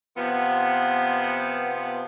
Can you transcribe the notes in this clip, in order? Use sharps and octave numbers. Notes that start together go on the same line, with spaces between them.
C3 F3 B3